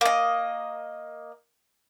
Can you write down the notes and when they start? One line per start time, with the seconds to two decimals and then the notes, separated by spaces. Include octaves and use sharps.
0.01 A#3 D#5